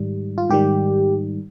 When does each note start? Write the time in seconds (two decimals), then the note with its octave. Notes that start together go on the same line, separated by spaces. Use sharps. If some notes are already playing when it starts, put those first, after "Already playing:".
Already playing: G#2 D#3 G3
0.38 F4
0.49 G#2 D#3 G3 G4